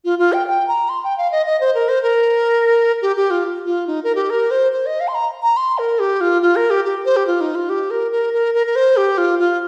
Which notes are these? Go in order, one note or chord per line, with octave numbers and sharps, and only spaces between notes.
F4
F4
G5
G5
A#5
C6
G5
F5
D#5
D#5
C5
A#4
C5
A#4
G4
G4
F4
F4
D#4
A#4
G4
A#4
C5
C5
D#5
F5
C6
A#5
A#5
C6
A#4
G4
F4
F4
A#4
G4
G4
C5
G4
F4
D#4
F4
G4
A#4
A#4
A#4
A#4
A#4
C5
G4
F4
F4